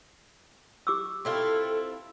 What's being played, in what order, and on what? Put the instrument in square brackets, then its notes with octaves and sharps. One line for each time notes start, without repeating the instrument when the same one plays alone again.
[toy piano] G4 D6 E6
[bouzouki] C4 E4 F4 [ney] A4